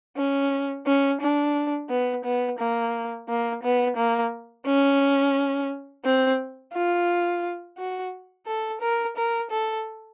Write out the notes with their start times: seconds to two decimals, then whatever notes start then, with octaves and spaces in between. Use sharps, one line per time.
0.17 C#4
0.86 C#4
1.21 D4
1.89 B3
2.25 B3
2.59 A#3
3.28 A#3
3.63 B3
3.97 A#3
4.66 C#4
6.05 C4
6.73 F4
7.78 F#4
8.47 A4
8.81 A#4
9.16 A#4
9.51 A4